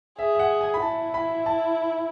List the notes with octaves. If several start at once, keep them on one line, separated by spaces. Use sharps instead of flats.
G#4 E5
E5
F#5
G#5
B5
E4 A5
B5
A5